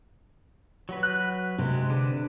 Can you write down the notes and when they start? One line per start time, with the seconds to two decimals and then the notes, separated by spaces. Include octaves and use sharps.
0.89 F#3 F#4 B4
1.03 F#6
1.59 C3 G#3
1.90 D3 D4 B4